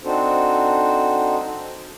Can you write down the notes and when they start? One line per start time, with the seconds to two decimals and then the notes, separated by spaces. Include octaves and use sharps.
0.04 C4 D4 D#4 F#4 A4 C5